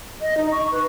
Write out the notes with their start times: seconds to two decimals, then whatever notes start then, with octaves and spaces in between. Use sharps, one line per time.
0.22 D#5
0.37 D#4
0.52 C#6
0.72 B4